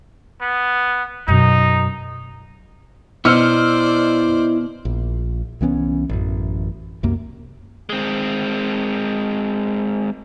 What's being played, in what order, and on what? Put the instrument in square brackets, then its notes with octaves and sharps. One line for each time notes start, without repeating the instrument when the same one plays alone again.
[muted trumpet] B3
[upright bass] F#2 B2 [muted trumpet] D#4
[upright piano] B2 [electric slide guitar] E4 D#5 [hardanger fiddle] C5 D5 [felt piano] E6 F6 C#7
[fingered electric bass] A#1
C2 E3 B3 C#4
A1 F#2
C2 F#2 A#3
[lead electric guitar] G#3 C4